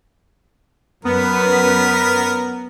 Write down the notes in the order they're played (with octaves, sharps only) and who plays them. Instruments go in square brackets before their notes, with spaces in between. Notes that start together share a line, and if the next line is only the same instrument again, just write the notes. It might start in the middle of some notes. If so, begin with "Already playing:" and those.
[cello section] F#2 B4 [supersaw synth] B3 [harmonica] A#4